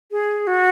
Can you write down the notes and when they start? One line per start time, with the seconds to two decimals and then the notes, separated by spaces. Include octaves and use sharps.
0.11 G#4
0.47 F#4